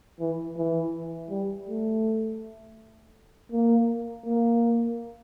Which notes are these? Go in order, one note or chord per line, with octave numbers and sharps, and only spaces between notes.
E3
E3
G3
A3
A#3
A#3